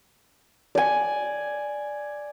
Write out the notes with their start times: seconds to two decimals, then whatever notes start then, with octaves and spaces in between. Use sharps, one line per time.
0.75 D5 G#5